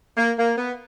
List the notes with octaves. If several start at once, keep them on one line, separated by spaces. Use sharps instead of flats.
A#3
A#3
B3